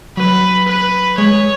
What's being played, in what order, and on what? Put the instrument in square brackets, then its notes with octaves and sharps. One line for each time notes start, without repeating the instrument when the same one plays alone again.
[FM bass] F#3 [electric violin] B4
[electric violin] B4
[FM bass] G#3 [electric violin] C#5